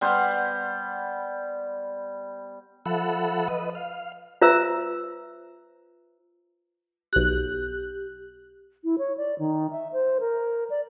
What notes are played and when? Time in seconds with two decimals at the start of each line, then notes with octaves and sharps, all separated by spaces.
0.01 G3 B3 C5 F#5
2.86 F3 A4 E5 F#5 B5
3.48 B4 D#5
3.75 F5
4.42 F4 B4 C5 E5 A#5 E6
7.13 B1 G4 F#6
8.84 E4
8.98 C#5
9.17 D5
9.39 D#3
9.71 E5
9.93 C5
10.20 A#4
10.70 D5